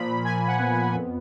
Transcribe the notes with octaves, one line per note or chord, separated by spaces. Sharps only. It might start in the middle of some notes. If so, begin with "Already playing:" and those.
Already playing: A#2 F3 B5
A#2 G#5
F#5
B3
G#5
F2